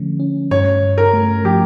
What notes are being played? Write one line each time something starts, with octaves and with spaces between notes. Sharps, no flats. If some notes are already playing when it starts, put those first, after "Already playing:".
Already playing: D3 F3 A3 C#4
C#4
G2 C#5
G2
A#4
A3
F3 G4